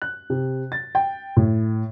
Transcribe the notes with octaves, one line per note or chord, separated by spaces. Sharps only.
F#6
C3
A6
G5
A2